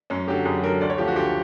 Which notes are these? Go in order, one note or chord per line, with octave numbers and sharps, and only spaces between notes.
F#2 C#4
D3 F#3 G4
F#2 G#4
D3 F#3 A#4
D2 D5
C#5
D3 F3 G4
F#4
D2 G4